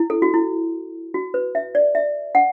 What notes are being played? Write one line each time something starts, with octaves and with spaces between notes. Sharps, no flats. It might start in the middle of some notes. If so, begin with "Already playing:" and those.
Already playing: E4
A4
F#4
E4
F#4
B4
E5
D5
E5
F#5